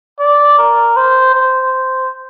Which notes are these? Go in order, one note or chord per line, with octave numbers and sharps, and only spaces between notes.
D5
A#4
C5
C5